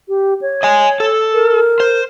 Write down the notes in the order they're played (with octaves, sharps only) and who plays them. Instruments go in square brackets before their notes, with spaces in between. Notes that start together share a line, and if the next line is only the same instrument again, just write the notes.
[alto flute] G4
C#5
[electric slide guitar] D#5 G#5
A4
[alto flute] A#4
[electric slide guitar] C5